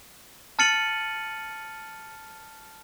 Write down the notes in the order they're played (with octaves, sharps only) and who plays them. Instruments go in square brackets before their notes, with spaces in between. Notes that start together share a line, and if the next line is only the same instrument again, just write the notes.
[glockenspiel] A5 F6 A6 C#7 D#7 F#7